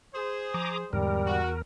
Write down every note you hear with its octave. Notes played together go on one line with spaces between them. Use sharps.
G#4 C5
F3 A#5 D6 D#6
E2 G#2 D3 G3 A#4
F#4